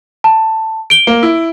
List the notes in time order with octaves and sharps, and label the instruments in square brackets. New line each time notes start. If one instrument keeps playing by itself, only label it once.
[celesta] A5
D7 G7
[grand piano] A#3
E4